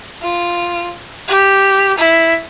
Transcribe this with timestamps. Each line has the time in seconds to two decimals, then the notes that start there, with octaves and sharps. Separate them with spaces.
0.23 F4
1.28 G4
1.98 E4